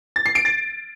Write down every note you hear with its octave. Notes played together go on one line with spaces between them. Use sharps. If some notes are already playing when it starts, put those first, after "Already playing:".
A6
C7
D7
A6